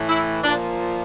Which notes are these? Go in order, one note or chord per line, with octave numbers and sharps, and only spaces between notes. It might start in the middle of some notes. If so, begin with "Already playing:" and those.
Already playing: A2 E3
E4
A#2 F3 D4